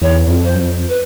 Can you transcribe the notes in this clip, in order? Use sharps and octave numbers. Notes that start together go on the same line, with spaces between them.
E2 C#5
E2
F2
C5
F#2
F2
B4